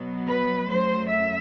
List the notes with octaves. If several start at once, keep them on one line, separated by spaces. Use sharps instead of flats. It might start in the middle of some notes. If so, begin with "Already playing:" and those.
Already playing: B2 F#3 B3
B4
F#2 F#3 A3 C5
E5